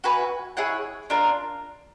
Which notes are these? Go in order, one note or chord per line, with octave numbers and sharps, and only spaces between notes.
F#4 B4 E5 G#5
E4 G#4 C#5 F#5
D4 F4 A#4